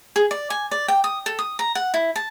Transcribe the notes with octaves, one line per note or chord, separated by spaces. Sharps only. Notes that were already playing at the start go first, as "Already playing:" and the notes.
G#4
D5
G#5
D5
G5
D#6
A4
D#6
A#5
F#5
E4
A5